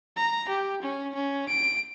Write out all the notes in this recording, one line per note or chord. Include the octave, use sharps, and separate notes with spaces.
A#5
G4
C#4
C#4
D7